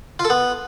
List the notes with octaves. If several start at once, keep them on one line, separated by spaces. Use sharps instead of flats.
F4
A4
B3